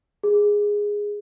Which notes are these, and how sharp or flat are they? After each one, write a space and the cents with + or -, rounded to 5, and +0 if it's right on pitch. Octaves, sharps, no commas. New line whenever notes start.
G#4 -5